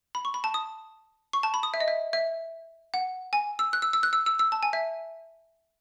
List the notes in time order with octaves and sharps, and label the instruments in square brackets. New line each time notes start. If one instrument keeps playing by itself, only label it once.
[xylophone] B5
C#6
B5
A5
D#6
C#6
A5
B5
D#6
E5
D#5
E5
E5
F#5
G#5
E6
F#6
E6
E6
F#6
E6
E6
E6
A5
G#5
E5